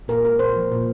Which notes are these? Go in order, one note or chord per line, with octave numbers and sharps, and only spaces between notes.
A#2 A#4
G#3 A#4
A#2 C5
F3
A#2